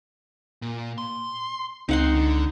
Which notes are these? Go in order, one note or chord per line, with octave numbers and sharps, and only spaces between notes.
A#2
C6
C#2 C4 D#4 F#5 C6
D3